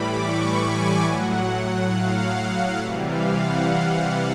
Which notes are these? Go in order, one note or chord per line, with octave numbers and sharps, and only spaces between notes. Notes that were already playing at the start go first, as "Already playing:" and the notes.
Already playing: A2 E3 G3 B5 D6
C#6
G#5
A2 F#3 F#5
F5
C3 E3 G3 E5
F5
F#5
F5